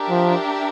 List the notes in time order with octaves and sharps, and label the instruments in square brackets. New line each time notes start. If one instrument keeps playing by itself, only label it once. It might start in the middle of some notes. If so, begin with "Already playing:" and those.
Already playing: [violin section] D4 G4 A#4 E5
[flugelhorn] F3